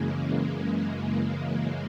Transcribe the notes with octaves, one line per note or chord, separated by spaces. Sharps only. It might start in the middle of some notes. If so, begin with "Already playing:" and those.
Already playing: F#2 C#3 E3 G#3 A#3
G#3 A#3